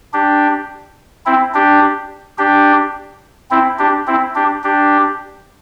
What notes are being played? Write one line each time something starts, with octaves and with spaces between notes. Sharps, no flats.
D4 G4
C4 E4
D4 G4
D4 G4
C4 E4
D4 G4
C4 E4
D4 G4
D4 G4